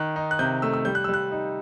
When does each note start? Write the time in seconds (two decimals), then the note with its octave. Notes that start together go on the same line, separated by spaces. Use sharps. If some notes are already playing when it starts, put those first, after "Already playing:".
Already playing: D#3 F#6
0.16 D#4
0.31 F#6
0.39 C3 G6
0.62 A3 E6
0.73 E6
0.85 G3 G6
0.95 F#6
1.04 E6
1.09 G3 F#6
1.31 D#4